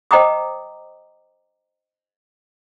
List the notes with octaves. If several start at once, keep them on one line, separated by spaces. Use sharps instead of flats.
C5 D#5 G5 A#5 D6 D#6